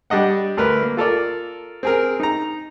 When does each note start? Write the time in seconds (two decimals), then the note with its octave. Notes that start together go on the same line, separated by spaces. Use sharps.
0.10 G3 D4 D#5 F#5
0.57 D2 A#4 B4
0.83 A#3
0.97 F4 A4 A#4 D5
1.83 C4 G#4 A#4
2.20 D#4 A#5